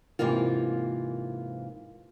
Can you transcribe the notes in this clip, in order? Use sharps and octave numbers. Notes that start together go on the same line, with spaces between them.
G#2 C3 E3 A#3 F4